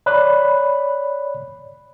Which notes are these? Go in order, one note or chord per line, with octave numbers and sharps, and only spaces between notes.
C#5 D5 B5 F#6